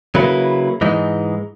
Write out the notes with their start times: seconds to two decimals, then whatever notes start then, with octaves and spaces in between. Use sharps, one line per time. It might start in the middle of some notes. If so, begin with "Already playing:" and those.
0.15 C#3 F#3 A#3 E4 B4
0.81 G#2 E3 G#3 D#4